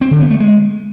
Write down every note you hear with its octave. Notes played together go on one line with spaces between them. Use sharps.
C4
D3
B3
A3
G#3